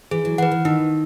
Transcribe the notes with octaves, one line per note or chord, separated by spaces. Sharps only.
E3 G#4
F#3
E3 B4 F#5
D#3
D#3 D#4